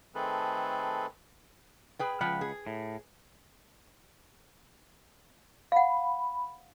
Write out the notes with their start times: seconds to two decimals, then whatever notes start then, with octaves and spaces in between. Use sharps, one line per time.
0.15 D#3 A3 C4 G#4 A4 B4
1.99 G#4 B4 G5
2.21 C#2 F3 F#5 G5 B5
2.41 G#4
2.67 A2
5.72 F5 F#5 B5